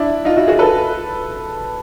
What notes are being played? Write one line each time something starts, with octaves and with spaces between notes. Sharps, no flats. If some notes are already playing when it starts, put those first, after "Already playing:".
Already playing: D4 E4
D#4 F4
E4 F#4
F#4 G#4
A4 B4